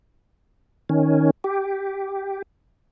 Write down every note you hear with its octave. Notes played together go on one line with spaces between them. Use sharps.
D#3 C#4
G4